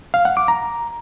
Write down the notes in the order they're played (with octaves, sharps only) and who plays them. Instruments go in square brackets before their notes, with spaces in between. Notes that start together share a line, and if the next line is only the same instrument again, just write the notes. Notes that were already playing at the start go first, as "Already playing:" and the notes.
[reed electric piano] F5
F#5
D6
A#5